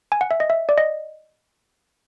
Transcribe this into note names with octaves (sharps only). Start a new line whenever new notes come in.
G#5
F#5
E5
D#5
E5
D5
D#5